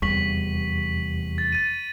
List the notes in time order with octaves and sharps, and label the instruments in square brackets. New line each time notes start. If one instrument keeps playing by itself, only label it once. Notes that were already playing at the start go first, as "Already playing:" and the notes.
[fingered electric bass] F1 E2 G3 [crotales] C#6 B6 F#7
[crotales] A6
A6 D#7